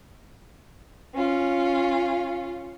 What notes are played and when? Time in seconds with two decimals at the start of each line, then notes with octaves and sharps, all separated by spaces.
1.14 C#4 F4